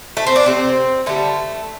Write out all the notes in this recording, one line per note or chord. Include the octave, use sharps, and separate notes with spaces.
A3
C4
D4
C3 A3 C4
D3 G3 A3